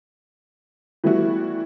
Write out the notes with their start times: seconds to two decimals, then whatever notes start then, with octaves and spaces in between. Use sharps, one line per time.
1.04 E3 G3 A3 B3 E4 F#4